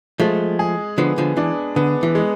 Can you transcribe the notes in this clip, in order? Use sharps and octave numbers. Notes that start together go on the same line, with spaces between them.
F3 G#3 A3
G#4
D3 F3 B3
D3 F3
E3 D4
D3 B3
E3
G#3